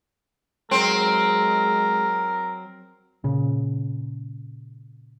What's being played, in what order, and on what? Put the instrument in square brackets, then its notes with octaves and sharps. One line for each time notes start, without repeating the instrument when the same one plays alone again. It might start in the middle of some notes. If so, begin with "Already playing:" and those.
[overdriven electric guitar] F#3 [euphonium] G#3 [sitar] C4 [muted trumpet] A#4
[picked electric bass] A#2 C#3